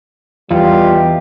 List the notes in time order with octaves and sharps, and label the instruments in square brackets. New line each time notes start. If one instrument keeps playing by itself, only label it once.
[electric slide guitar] E2 [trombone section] E3 D#4 G4 [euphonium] G3 [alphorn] F4